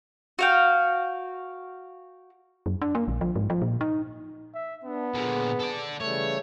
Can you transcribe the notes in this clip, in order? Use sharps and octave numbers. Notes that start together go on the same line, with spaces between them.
F#4 F5 G5
F#2
D4
A#3
A#1
F3
G#2
F3
A#2
D#4
E5
B3 D4
A#2 D3 G#4
A4 D5
C#3 E3 G3 A3 C#5